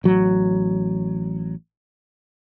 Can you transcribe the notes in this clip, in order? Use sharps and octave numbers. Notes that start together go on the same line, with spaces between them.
A1 F#3